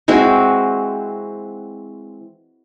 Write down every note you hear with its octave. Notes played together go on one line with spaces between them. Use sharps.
E3 G#3 C4 F#4